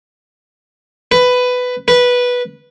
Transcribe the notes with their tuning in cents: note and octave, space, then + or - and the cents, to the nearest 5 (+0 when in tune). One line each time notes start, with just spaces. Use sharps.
B4 +10
B4 -10